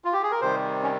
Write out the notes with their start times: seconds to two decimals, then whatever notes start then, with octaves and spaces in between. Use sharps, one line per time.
0.05 F4
0.13 G4
0.23 G#4
0.31 A#4
0.41 C3 D#3 G3 C5
0.83 C#4